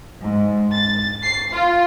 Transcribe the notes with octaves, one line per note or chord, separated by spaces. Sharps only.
G#2
A6
C7
F4